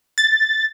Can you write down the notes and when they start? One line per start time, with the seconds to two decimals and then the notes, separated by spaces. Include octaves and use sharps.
0.18 A6